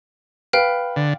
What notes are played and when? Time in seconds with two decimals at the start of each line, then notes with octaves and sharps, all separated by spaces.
0.53 B4 F5 G5 F6
0.96 D3